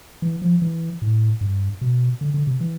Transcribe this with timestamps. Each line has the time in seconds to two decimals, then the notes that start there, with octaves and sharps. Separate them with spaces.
0.22 E3
0.42 F3
0.62 E3
1.02 A2
1.41 G2
1.81 B2
2.21 D3
2.34 D3
2.47 C3
2.61 E3